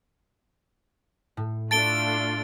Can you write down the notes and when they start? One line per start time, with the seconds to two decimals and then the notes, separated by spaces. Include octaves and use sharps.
1.37 A2
1.71 A3 D4 F4 A5 A6 D7 E7 G7